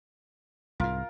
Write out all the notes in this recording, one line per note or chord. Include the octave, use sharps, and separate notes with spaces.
C2 G#2 F4 A#4